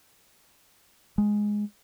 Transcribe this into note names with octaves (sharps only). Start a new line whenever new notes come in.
G#3